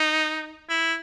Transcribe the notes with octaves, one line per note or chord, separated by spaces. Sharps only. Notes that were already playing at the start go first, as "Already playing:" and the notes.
Already playing: D#4
E4